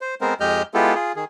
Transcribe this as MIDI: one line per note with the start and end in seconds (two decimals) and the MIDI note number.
0.01 0.15 72
0.21 0.34 56
0.21 0.34 59
0.21 0.34 60
0.21 0.34 70
0.21 0.34 72
0.40 0.63 41
0.40 0.63 56
0.40 0.63 67
0.40 0.63 75
0.40 0.63 89
0.40 0.63 91
0.74 0.95 56
0.74 0.95 59
0.74 0.95 64
0.74 0.95 65
0.74 0.95 67
0.74 0.95 69
0.95 1.12 65
0.95 1.12 68
1.16 1.25 51
1.16 1.25 68